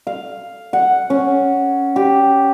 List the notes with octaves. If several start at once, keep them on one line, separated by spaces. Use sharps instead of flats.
F5
F#5
C#4
G4